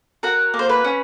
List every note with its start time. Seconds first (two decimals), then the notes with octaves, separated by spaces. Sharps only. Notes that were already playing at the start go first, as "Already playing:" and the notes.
0.23 F#4 A#4
0.54 A#3
0.59 C5
0.69 B4
0.84 C#4